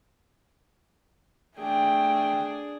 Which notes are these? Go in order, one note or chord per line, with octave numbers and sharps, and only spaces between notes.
A3 D4 G#4 G5